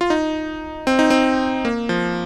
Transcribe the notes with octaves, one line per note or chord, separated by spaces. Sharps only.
F4
D#4
C4
D#4
C4
A#3
F3